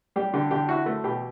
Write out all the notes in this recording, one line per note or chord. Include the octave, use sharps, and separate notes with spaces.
G3 G4
D3 G4
D3 G4
E4 F#4
A3
B2 G4